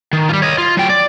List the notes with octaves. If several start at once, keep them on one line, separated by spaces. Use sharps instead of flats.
D#3
G3 F4
C#5 D#5
F4
F#3 G5
D5